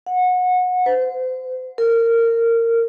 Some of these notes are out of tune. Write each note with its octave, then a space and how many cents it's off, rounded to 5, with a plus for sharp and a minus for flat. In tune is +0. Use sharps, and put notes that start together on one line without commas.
F#5 -25
C5 -30
A#4 -20